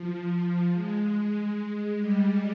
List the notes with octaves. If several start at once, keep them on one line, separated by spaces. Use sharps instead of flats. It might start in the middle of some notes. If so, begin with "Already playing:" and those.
Already playing: F3
G#3
G3